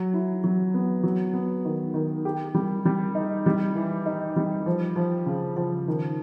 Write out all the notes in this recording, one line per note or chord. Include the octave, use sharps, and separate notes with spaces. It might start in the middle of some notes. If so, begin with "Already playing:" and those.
Already playing: F#3
E4
F#3
B3
F#3
B3
D#3
D#3
G4
G3
G3
D#4
G3
E3
D#4
G3
F3
F3
C#3
F3
D#3